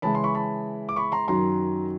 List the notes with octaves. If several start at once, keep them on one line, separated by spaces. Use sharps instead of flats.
C#3 E3 G#3 A5 B5
C6
B5 C#6
A5 B5
D6
B5 C#6
A#5 C6
F#2 D#3 F#3 A#5 C6